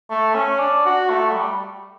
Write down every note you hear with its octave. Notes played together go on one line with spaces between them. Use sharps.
A3
C#4
D4
F#4
A3
F#3
G3